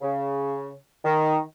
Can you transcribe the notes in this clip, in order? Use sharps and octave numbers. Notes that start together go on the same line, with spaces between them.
C#3
D#3